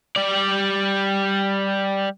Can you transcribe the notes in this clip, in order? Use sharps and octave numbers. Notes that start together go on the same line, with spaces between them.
G3 D5